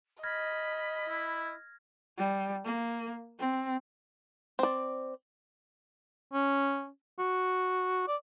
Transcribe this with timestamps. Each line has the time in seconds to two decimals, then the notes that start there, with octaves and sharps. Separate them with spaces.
0.23 D#5 B5 F6 G#6 A#6
1.09 E4
2.18 G3
2.65 A#3
3.39 C4
4.59 C4 D5
6.33 C#4
7.19 F#4
8.08 D5